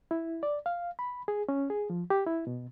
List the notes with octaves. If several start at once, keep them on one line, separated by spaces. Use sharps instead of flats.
E4
D5
F5
B5
G#4
C#4
G#4
F3
G4
E4
B2